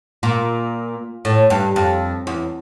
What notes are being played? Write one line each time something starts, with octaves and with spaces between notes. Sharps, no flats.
A#2
A2
G2
F2
E2